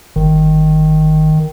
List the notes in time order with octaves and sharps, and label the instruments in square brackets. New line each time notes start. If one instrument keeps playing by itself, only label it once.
[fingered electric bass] G1 [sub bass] D#3